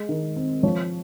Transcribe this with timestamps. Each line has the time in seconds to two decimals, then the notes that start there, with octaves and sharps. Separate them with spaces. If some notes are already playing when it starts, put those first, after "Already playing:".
Already playing: G#3
0.09 D#3
0.36 C4
0.63 F3 C#5